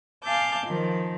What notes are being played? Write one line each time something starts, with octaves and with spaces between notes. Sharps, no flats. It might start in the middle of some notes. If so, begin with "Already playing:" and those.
F5 G#5 A5 D6 G6
D#3 F3